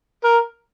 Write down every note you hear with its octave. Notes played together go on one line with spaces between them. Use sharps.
A#4